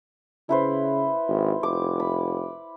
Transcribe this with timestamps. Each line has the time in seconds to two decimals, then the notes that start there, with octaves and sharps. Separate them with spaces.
0.49 C#3 E4 B4 C5
1.28 G#1
1.63 F1 D6
2.00 B5